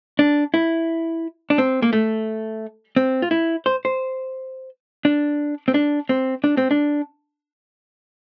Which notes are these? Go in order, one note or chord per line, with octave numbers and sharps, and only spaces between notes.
D4
E4
D4
C4
A#3
A3
C4
F4
E4
C5
C5
D4
C4
D4
C4
D4
C4
D4